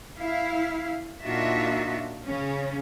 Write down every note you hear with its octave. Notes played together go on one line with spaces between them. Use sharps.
E4 F5
A#2 D4 D#4 F4 F#4 E5
C#3 C#4